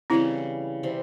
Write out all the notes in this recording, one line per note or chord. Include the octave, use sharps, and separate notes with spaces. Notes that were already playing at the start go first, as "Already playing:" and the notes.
C#3 E3 G3 C4 C#4 E4
C3 E3 G3 C4